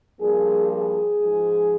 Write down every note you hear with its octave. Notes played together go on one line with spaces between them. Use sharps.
G2 F3 A#3 G#4
G#4
G#2 F3 G#3